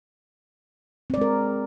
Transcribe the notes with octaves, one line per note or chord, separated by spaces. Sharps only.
G#3 C4 A#4 D5